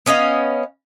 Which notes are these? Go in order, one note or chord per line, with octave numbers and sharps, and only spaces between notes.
B3 C#4 D#5 F5